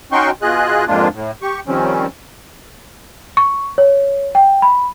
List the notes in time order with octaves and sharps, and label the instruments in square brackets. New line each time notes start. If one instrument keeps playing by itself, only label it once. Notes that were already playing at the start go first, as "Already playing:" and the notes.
[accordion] C#4 D#4 F#4 G5 C6 C#6
B2 F4 G#4 D#5 F#6
F2 G#2 G#3 A#3 D4 F4
A2
G4 C#6
D#3 F3 G3 C4 C#4
[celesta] C#6
C#5
G5
B5